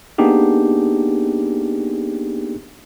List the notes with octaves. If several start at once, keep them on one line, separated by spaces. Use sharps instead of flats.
A#3 B3 D4 D#4 G4 G#4